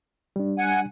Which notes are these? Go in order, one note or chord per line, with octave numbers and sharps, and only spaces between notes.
G3 D4
F#5 G#5